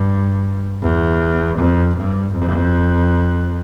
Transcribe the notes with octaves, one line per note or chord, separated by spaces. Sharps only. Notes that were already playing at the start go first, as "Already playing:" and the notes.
Already playing: G2
E2
F2
G2
F2